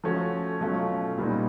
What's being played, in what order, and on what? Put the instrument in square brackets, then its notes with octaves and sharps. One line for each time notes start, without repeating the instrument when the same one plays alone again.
[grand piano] F3 A3 C#4 F#4
B2 F#3 A3 C#4 F4
A#2 G3 B3 D#4